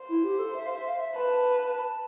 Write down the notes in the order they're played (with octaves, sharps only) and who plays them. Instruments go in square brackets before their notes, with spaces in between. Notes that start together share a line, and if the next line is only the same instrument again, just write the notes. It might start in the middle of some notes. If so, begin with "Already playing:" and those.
Already playing: [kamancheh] C5
[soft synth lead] E4
G4
A4
E5
F5
E5
F5
E5
[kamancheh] B4 [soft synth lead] A5